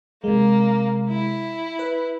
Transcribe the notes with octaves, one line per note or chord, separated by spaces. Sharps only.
C3 G#3 A#3
E4
B4